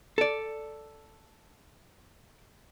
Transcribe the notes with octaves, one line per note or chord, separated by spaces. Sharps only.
A4 D5